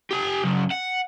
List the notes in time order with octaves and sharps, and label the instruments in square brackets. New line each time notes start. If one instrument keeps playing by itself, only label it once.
[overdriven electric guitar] G4 G#5
F#2 C#3
F#5